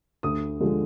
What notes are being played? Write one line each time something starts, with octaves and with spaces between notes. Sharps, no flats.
D2 D#6
D3 F3 G#3